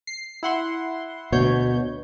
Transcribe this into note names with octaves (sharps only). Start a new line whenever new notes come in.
C7
E4 F#5 C6
D2 B2 C#5 G6